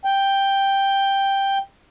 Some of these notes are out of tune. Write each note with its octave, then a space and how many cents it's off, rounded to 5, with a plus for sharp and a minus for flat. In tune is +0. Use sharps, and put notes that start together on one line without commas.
G5 +5